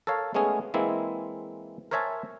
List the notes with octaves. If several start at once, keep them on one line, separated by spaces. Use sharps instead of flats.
A4 A#4 C#5 F5
G#3 A3 B3 C#4 G#4
E3 G#3 A#3 C4 E4
A#4 C5 C#5 E5 G#5 A5